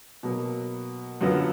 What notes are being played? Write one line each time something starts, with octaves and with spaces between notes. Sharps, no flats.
B2 F#3 A#3
F#2 D3 F#3 B3 F4